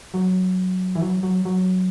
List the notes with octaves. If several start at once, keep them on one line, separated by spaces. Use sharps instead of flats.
F#3
E3
F#3
F#3
F#3